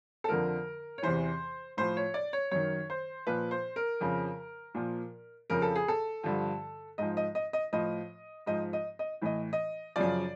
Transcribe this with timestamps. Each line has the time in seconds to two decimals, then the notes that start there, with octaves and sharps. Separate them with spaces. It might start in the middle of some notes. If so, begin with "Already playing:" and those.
0.24 A4
0.29 F2 D3 F3 A#4
0.98 C#5
1.03 E2 C3 E3 C5
1.77 A2 F3 C5
1.97 C#5
2.14 D5
2.33 C#5
2.51 F#2 D#3 C#5
2.90 C5
3.27 A#2 F3 B4
3.51 C5
3.76 A#4
4.00 F2 C#3 F3
4.75 A#2 F3
5.50 F2 C#3 F3 A#4
5.62 A4
5.75 G#4
5.88 A4
6.23 G2 D3 F3
6.98 G#2 F3 D#5
7.17 D#5
7.35 D#5
7.53 D#5
7.73 A2 F3 D#5
8.46 G#2 F3 D#5
8.73 D#5
8.99 D#5
9.22 A2 E3 D#5
9.53 D#5
9.96 F#2 C#3 F3 D5